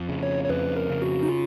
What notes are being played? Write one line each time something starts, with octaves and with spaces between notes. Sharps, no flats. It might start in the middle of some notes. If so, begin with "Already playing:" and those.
Already playing: F2
C#3
C#5
C#5
F2 B4
A#4
C#3
F#4
D#4
F4